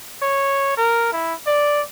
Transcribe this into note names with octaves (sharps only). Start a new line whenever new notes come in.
C#5
A#4
E4
D5